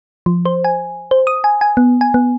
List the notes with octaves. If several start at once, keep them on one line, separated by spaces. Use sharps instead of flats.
F3
C5
G#5
C5
D#6
G#5
G#5
B3
G#5
B3